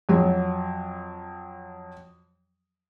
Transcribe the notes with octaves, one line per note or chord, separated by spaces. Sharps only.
F2 F#3